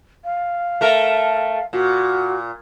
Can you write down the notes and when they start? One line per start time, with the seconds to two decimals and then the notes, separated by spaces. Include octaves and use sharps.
0.24 F5
0.81 A3 A#4
1.73 A#2 F#4